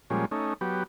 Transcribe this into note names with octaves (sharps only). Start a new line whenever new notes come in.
A#2 F3 G3 G#3 C#4
A3 C#4 D#4
F#3 B3 G4